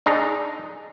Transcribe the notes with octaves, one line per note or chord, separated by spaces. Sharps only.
D4 D#4 G#4 D#5 A#5